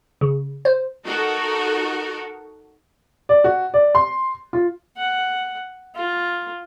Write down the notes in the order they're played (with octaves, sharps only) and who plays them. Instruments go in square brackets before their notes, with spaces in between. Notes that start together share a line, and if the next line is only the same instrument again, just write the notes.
[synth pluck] C#3
C5
[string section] D#4 F#4 A4 A#4
[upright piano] D5
F#4
D5
C6
F4
[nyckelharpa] F#5
F4